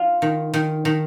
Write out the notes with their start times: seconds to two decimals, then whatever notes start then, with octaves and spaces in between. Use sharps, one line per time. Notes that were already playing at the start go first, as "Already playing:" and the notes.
Already playing: F4
0.22 D#3
0.54 D#3
0.85 D#3